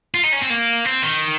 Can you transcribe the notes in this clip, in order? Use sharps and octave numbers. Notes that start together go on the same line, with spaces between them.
F4
D#4
C#4
C4
A#3
C4
D#3